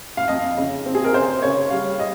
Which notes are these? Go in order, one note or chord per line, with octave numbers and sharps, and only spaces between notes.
F5
F2 D#5
C#3
C4
G#4
A#4
C#3 C5
C#3 C#5
G3 F5
D#5